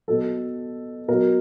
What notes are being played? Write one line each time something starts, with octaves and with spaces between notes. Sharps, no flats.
B2 F#3 A4
B2 F#3 A#4